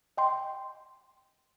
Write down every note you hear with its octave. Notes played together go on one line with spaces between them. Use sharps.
D#5 G5 C6